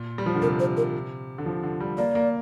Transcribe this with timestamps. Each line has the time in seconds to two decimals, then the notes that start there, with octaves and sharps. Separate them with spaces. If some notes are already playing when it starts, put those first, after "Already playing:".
Already playing: A#2
0.18 G3
0.26 F3
0.34 D3
0.42 C3 A#4
0.60 C5
0.77 A#4
1.38 D3
1.46 F3
1.63 D3
1.80 G3
1.98 A#3 D5
2.15 A#3